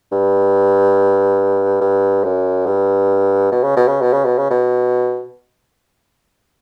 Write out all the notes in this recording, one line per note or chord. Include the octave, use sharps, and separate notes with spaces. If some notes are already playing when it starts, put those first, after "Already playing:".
G2
G2
F#2
G2
B2
C#3
B2
C#3
B2
C#3
B2
C#3
B2